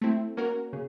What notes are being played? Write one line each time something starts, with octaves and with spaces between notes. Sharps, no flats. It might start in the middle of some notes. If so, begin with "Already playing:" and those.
A3 C4 E4
A#3 C#4 F#4 A#4
C#3